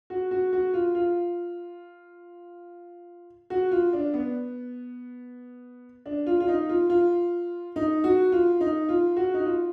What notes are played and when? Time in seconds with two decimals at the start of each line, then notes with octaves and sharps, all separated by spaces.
0.10 F#4
0.31 F#4
0.53 F#4
0.74 F4
0.95 F4
3.50 F#4
3.71 F4
3.93 D4
4.14 B3
6.06 D4
6.26 F4
6.40 F4
6.48 D#4
6.69 F4
6.90 F4
7.76 D#4
8.04 F#4
8.32 F4
8.61 D#4
8.89 F4
9.17 F#4
9.34 D#4
9.45 F4